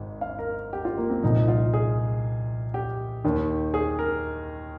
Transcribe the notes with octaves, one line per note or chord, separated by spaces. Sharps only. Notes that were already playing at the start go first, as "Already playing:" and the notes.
Already playing: G#1 G#2
F5
A#4
G4
F4
A#3
C4
C2 A#2 F3 D#4
F4
G#4
G4
D#2 D#3
G#4
A#4